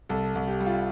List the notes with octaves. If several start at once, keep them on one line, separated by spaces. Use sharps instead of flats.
C2 A4
C2
G4
G3
F4